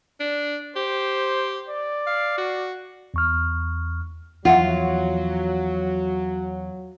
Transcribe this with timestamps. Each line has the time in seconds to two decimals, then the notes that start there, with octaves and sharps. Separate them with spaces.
0.20 D4
0.76 G4 C5
1.69 D5
2.07 F5
2.37 F#4
3.14 E2 C#6 F6
4.45 E2 F3 F#3 F4 E5 F#5